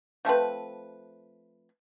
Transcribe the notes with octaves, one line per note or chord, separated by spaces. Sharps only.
F3 A3 C4 B4